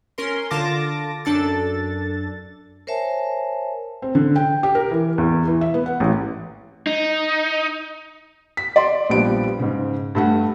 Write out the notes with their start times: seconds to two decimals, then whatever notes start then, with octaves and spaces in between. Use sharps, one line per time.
0.18 C#4 A#4 C6
0.51 D3 F4 A5 D6 A#6
1.25 F#2 D4 A4 A6
2.87 A#4 C5 C#5 E5 G#5 A5
4.02 C4
4.15 D3
4.36 G5
4.63 G4
4.75 A#4
4.91 E3
5.18 E2
5.47 E3
5.61 E5
5.74 B3
5.86 F#5
6.00 A1
6.87 D#4
8.57 B6
8.76 D5 C6
9.10 A#1 F3 G3 B3 D7
9.59 G#2 C#3
10.15 G2 A3 F#5